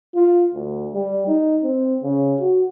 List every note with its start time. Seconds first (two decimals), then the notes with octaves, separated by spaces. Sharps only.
0.14 F4
0.55 D2
0.94 G3
1.27 D#4
1.63 C4
2.03 C#3
2.40 F#4